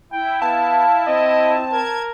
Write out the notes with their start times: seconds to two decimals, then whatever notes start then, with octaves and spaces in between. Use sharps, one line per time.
0.12 E4 G5
0.42 B3 F5 A5
1.07 C4 D#5
1.73 A#4 G#6